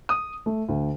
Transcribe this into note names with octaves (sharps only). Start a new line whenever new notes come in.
D#6
A3
D2